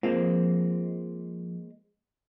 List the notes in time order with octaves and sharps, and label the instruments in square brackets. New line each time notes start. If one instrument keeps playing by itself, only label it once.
[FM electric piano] F3 [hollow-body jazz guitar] G#3 A#3 C4